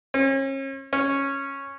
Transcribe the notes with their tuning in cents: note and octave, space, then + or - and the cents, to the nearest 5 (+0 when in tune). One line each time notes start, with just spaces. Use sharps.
C#4 -40
C#4 -10